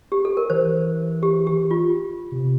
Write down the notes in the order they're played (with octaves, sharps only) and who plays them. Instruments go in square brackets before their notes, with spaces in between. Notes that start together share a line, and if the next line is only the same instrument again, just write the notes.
[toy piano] G4
A4
A#4
[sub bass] E3 [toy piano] C5
[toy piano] G4
G4
F4
[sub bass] C3